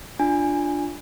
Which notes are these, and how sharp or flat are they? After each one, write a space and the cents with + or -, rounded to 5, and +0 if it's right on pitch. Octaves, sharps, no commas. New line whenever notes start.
D4 +0 F4 +0 G#5 -10